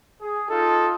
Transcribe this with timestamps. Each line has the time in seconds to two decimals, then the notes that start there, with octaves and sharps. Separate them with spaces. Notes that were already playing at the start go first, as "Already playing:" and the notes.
0.21 G#4
0.50 D#4 F4 A4